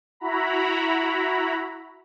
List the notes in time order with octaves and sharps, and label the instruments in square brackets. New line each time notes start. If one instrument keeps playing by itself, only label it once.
[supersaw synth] E4 F#4 A#5 B5